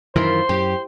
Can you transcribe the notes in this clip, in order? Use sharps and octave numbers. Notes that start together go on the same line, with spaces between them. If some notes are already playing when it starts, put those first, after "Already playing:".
F#2 D#3 E3 E4 F4 A#4 C5 C6
F#2 G4